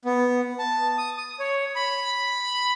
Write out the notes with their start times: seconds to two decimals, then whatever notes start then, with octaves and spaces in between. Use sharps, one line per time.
0.05 B3
0.59 A5
0.98 D#6
1.17 D#6
1.40 C#5
1.76 B5